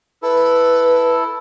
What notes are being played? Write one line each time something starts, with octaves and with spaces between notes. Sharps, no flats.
E4 A4 B4